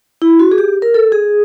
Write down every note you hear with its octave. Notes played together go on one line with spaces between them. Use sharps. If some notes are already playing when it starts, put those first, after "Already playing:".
E4
F#4
G#4
G4
A#4
A4
G#4